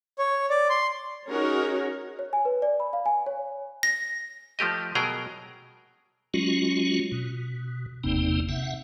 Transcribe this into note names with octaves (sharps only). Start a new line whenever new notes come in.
C#5
D5
C6
C#4 D#4 F#4 G#4 A#4 C#5
C#5
G#5
B4
D5
B5
F5
G#5
C#5
A#6
F3 A3 G4 D#5
B2 F#3 G#4 A#4 G5 A#5
F#3 G#3 C#4 F4 F#4
B2
G1 E2 C3 A#3 C4 D#4
C3 E5 F#5